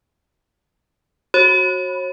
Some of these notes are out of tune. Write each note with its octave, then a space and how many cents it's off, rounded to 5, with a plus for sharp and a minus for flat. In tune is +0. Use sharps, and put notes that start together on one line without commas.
F#4 +0 C#5 -40 B5 +0